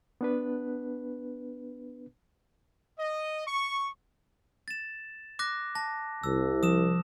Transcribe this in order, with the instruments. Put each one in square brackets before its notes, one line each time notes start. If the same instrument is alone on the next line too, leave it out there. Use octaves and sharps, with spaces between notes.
[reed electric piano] B3 D4 B4
[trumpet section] D#5
C#6
[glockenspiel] A6 E7
D6 F#6 A#6
A5 A#6
[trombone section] C2 [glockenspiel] E6
[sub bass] F3 [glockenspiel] D#6 E7